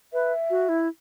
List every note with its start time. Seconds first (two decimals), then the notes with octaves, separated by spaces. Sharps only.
0.13 B4 E5
0.50 F#4
0.69 E4